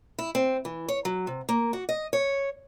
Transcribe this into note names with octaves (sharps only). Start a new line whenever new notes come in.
E4
C4
E3
C#5
F#3
C3
A#3
F#4
D#5
C#5